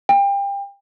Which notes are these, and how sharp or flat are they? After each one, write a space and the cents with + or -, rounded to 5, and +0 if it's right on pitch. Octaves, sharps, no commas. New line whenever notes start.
G5 +30